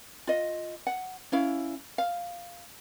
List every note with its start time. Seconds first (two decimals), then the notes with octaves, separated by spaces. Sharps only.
0.27 F4 D#5
0.87 F#5
1.32 C#4 E4 F5
1.98 F5